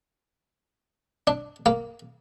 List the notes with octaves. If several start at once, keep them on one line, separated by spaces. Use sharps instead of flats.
D4
A#3